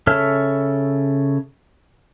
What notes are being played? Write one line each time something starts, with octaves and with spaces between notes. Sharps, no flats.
C#3 A4 C#5 E5 F6